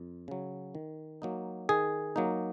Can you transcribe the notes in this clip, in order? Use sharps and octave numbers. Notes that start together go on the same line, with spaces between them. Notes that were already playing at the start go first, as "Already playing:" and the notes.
Already playing: F2
C#3 F#3
D#3
F#3 A#3 D#4
D#3 G#4
F#3 A#3 D#4